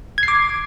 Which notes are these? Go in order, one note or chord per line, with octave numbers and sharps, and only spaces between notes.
G#6
C7
D6